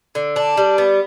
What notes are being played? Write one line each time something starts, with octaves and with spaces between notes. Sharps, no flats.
D3
D4
G3
B3